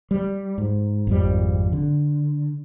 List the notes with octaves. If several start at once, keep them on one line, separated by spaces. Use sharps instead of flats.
G3
G#2
G#1 F2 G3
D3